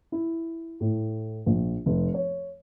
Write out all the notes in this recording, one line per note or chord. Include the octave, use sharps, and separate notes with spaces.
E4
A2
A#1
F1
C#5